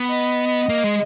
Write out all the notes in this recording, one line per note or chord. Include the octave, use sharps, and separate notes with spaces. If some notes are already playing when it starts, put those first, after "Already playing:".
Already playing: B3
D#5
A#3
G#3